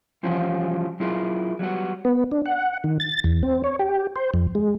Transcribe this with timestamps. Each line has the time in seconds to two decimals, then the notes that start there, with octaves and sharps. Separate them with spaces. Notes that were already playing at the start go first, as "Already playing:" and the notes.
0.23 E3 F3 G3 C#4 F4 F#4
1.00 F#3 E4 F4 G#4 A#4
1.59 F#3 G3 B3 F#4
2.05 B3
2.32 D4
2.46 F#5
2.84 D#3
3.00 A6
3.24 E2
3.43 C4
3.64 C#5
3.79 G4
4.16 C5
4.34 F2
4.55 G#3